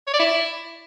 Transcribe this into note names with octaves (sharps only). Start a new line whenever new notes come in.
C#5
D5
E4